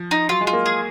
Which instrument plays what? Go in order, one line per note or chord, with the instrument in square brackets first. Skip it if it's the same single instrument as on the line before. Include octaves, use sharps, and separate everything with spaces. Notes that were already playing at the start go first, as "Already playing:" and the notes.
Already playing: [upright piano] F3
[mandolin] D#4
[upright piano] F#3 [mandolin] F4
[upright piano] G#3
[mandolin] F4
[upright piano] A#3
[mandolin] G#4